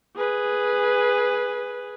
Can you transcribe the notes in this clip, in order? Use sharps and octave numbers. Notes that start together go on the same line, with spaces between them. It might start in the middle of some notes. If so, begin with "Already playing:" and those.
G#4 B4